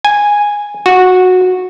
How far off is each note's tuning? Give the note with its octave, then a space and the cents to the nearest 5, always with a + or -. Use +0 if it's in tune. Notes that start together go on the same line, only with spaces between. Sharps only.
G#5 -5
F#4 -10